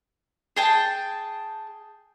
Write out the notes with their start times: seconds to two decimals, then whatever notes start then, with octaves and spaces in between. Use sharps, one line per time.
0.57 G#4 G5 A5